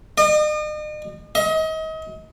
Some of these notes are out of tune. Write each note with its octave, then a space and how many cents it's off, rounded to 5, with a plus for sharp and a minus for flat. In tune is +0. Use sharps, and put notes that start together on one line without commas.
D#5 -40
D#5 +35